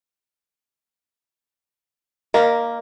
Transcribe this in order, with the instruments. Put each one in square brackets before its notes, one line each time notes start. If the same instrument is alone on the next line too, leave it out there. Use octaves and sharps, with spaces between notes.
[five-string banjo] A#3 [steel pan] A#4 [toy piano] D#5 F5